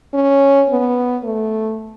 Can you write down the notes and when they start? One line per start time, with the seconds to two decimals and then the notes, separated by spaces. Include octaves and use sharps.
0.14 C#4
0.69 B3
1.24 A3